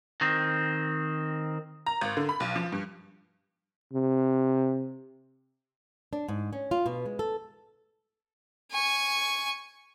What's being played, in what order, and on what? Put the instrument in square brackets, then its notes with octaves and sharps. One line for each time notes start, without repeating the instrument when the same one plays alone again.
[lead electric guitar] D#3 C4
[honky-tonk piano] A#5
G#1
D3
B5
B1
F3
G2
[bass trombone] C3
[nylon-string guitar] D4
G#2
C#4
F4
B2
G#3
A4
[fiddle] G#5 C#6